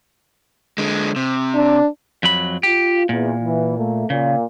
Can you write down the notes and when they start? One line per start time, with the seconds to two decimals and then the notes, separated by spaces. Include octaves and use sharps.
0.78 D3 G#3
1.16 C3
1.54 D4
2.23 F2 F#3 B5
2.63 F4 G4
3.09 E2 A#2
3.42 E3
3.78 A3 A#3
4.10 A#2 C#3